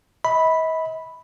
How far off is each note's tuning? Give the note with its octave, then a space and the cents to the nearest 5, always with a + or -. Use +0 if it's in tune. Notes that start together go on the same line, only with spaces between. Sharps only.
D#5 +45 B5 +0